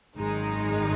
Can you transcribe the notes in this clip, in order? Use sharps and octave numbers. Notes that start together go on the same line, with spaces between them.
G#1 F#2 D#3 G#3 D#4